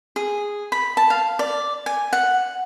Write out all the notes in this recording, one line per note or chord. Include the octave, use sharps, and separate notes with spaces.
G#4
B5
A5
F5
D5
G#5
F#5